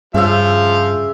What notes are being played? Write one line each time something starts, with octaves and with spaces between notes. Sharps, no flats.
G2 C#3 F3 E5 F5